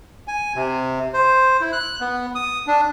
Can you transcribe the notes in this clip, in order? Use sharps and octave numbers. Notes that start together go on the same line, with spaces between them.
G#5
C3
C5
E4
F#6
B3
D#6
D4